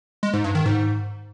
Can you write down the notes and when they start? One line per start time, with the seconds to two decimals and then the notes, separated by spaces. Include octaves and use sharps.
0.23 G#3
0.34 G#2
0.44 G2
0.55 D#3
0.66 G#2